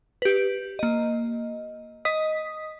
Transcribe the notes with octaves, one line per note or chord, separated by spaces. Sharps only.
G4 B4
A#3 D#5
D#5 D#6 B6